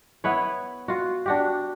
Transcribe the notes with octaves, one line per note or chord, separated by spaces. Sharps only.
B3 E4 B4 C#5
F4 F#4
D4 F#4 G4